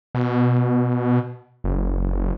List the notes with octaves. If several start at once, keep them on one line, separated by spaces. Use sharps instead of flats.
B2
F#1